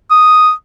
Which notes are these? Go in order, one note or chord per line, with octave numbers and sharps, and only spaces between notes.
D#6